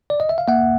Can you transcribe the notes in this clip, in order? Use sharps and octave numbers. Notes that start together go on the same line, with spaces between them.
D5
D#5
E5
F5
A#3 E5 F#5